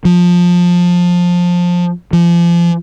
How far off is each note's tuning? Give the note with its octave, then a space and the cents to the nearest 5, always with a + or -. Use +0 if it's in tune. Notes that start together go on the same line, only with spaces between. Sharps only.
F3 +15
F3 -30